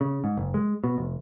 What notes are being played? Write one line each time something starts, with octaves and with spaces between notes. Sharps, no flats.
C#3
G#2
F#1
G#3
B2
F1